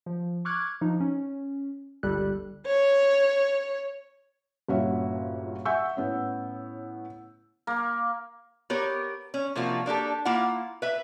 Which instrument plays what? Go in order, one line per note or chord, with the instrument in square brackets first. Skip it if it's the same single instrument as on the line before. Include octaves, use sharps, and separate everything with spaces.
[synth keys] F3
C#6 D6 F6 F#6 G#6
F3 D#4
C#4
G1 C#2 G3 G4 A4 F#6
[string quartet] C#5
[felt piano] G1 A#2 C#4 F#4 E5
E5 F#5 G#5 C#6 E6 G6
A2 B3 C#4
[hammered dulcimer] A#3
[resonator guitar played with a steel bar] B3 G4 A#4 C#5
C#4
C3 F3 A#3 D4 F4 F#4
A#3 D4 G4 A4
A#3 E4 F4 F#5
B4 E5